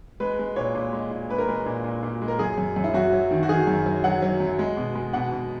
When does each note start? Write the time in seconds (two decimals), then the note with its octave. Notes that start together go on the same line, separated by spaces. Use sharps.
0.20 G#3 B4
0.39 G#3
0.56 A#2 C#5
0.75 A#2
0.93 G#3
1.11 A#2
1.30 G#3 B4
1.38 A#4
1.48 G#3 B4
1.66 A#2
1.84 A#2
2.03 A#2
2.22 G#3
2.28 A#4
2.39 F#2 G#4
2.58 F#2
2.76 F#2
2.84 E4
2.94 F#2 F#4
3.13 F#3
3.31 D#3
3.43 F#4
3.49 D#3 G#4
3.67 F#2
3.86 F#3
4.04 F#3 F#5
4.22 F#3
4.40 F#2
4.59 G#3
4.77 B2
4.95 G#3
5.13 B2 F#5
5.32 B2